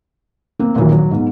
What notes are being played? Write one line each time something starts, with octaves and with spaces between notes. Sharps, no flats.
A#3 C4
G#1 D#2 A#2 E3 F#3
F#3
G#2 B3